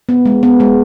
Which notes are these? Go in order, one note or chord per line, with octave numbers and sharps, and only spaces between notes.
B3
G#3
B3
G#3